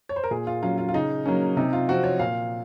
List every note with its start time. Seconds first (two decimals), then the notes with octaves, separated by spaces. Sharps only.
0.09 C#5
0.16 C5
0.24 A#4
0.31 A#2 G#4
0.47 F4
0.63 F#3 C#4 F4
0.78 F4
0.89 F4
0.94 C#3 D#4
1.26 F#3 A#3 C#4
1.57 C3 D#4
1.73 F4
1.89 F3 C4 F#4
2.04 C#5
2.19 A#2 F5